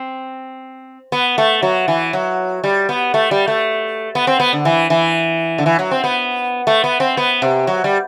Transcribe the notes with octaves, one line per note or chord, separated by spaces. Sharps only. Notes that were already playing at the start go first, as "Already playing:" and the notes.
Already playing: C4
B3
A3
F#3
E3
F#3
G3
B3
A3
G3
A3
B3
C4
B3
D3
E3
E3
D3
E3
F#3
C4
B3
A3
B3
C4
B3
C3
F#3
G3